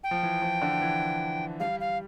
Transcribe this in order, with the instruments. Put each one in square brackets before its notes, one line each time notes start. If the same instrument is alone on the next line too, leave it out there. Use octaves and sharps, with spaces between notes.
[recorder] G5
[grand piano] F3
E3
F3
D3
E3
[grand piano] G3 [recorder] F5
[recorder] F5